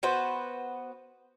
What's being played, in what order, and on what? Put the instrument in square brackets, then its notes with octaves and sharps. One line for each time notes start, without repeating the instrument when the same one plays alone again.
[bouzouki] B3 F#4 B4 C5